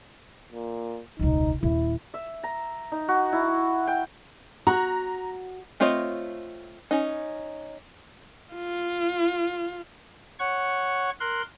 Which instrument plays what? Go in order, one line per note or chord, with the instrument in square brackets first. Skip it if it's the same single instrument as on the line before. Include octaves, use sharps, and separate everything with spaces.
[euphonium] A#2
[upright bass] E1 C#2 [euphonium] D#4
[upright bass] D#1 [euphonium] E4
[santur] E5
A#5
D#4
F#4
E4
G5
[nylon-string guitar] F#4 [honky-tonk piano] A#5
[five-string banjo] A3 C4 F4 C#5 D#5
C#4 D#4
[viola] F4
[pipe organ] C#5 F#5 C#6
A#4 C6 F#6